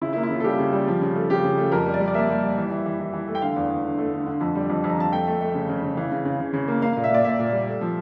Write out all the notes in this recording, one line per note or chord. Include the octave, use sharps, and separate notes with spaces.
C#3 E4
E4
A#3
E4
C#3 F4
A4
G3 G4
C#3
G3
F3
C#3
A3
C#3 G4
C#3
A3
F2 A#4
G3
D5
G3
D5
A#3 E5
G3
G3
E3
E3
E3
E3
E3
A3
G5
D3 F5
E2
E2
D3
A3
D3
D3
F2
G3
F2
F2
A#5
F2 A5
A3 G5
A3
A3
C#3
C#3
C#3
E3 F5
C#3
C#3
C#3
C#3
A#3
A#3 F5
F5
A#2
E5
A#2 D5
A#2 E5
A#2
G3
A3
F3